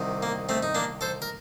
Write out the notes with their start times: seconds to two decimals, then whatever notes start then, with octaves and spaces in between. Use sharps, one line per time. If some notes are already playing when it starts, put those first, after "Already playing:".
Already playing: C2 C3 D#3
0.23 A#3
0.49 A3 C4
0.63 D#4
0.75 A#3 D4
1.01 A4 C5
1.22 A#4